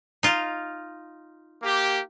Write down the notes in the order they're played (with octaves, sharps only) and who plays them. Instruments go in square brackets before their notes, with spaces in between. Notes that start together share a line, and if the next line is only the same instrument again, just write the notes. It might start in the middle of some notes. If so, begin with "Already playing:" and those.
[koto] D#4 F4
[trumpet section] A#3 G4